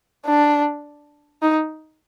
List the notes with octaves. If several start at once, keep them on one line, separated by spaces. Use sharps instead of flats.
D4
D#4